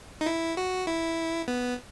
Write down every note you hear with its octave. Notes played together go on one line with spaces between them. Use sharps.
D#4
E4
F#4
E4
B3